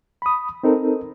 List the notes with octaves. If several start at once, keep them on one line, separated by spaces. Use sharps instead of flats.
B5 D#6
C4 D#4 A4 A#4